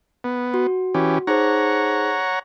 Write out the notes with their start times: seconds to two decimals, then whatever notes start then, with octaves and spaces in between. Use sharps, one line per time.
0.24 B3
0.54 F#4
0.94 E3 C#4 G4
1.27 D#4 G#4 C5 C#5 F#5 A#5